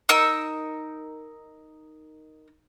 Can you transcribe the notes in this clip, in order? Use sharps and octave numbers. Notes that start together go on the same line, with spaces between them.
D#4 A#4 E6